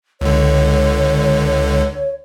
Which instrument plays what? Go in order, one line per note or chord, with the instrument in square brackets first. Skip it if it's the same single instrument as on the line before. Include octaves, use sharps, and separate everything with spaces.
[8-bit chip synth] C#2 D3 [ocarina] C#5